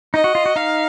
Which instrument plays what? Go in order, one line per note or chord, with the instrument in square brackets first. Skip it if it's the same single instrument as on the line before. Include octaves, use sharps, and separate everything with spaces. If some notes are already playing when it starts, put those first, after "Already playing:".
[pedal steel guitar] D#4 [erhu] D#5
[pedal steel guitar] F#4
F4
F#4
[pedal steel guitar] D#4 [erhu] F5